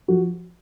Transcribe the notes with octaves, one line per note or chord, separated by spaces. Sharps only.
F3 F#4